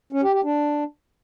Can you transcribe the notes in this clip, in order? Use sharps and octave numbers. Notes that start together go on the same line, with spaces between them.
C#4
G4
G4
D4